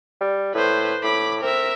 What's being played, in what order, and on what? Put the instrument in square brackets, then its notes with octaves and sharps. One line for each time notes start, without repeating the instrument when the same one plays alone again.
[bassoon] G3
[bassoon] A2 [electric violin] B4 C5
[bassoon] A2 [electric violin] B5 D6
[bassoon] C4 [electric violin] A#4 E5